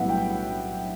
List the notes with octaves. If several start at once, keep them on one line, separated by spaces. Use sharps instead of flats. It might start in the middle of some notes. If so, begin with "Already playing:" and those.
Already playing: B1 A2 G3 B3 E5 F#5
G5